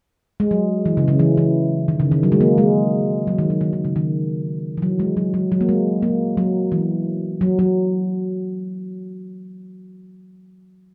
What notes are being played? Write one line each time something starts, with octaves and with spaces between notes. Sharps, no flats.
G#3
F#3
E3
C#3
C#3
E3
E3
D#3
C#3
D#3
F#3
G#3
A#3
G#3
F#3
D#3
F#3
D#3
D#3
C#3
D#3
E3
F#3
G#3
F#3
F#3
F#3
A#3
G#3
A#3
F#3
E3
F#3
F#3